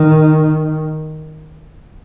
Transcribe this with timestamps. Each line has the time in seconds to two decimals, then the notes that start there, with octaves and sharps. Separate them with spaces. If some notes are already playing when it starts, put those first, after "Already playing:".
Already playing: D#3